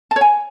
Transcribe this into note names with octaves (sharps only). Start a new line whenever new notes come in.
A5
C#5
G#5